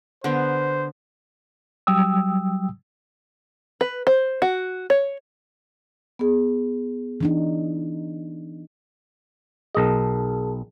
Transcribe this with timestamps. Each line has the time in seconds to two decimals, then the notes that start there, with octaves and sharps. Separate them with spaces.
0.24 D3 B3 C5
1.87 F#3 G3 G5 D#6 E6
3.81 B4
4.07 C5
4.42 F#4
4.90 C#5
6.19 B3 G#4
7.21 E3 D4 D#4
9.75 B1 G#4 A#4 D#5 A5